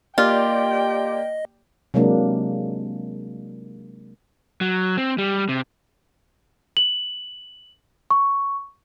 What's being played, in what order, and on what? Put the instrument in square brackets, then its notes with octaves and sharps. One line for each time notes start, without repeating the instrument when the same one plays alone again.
[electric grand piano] A#3 G4 D5 [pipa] F4 [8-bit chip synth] D#5 [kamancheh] G5
[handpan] C3 F#3 G#3 A#3 D4
[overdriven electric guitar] F#3
C4
G3
C3
[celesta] F#7
C#6